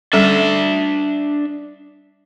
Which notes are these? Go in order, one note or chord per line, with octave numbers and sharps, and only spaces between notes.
G3 C#4 D4 A4 E5